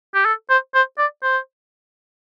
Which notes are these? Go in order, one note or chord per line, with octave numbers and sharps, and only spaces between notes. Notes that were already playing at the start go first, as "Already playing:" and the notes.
G4
A4
C5
C5
D5
C5